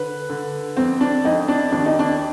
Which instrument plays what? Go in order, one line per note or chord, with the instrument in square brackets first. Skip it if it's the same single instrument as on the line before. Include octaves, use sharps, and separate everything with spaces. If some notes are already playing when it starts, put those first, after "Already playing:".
Already playing: [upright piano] D3 B4
D3
F2 C4
D4
F2 D#4
D4
D#2 D4
D#4
D4